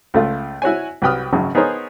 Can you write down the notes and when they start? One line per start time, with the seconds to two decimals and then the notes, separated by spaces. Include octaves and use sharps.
0.14 C#2 A3 F4
0.62 E4 F#4 C#5 G#5
1.02 C2 F#3 B4 G5 D#6 F6
1.33 G#1 F#2 C#3 F#3
1.55 B3 D#4 G#4 A#4 C5 C#5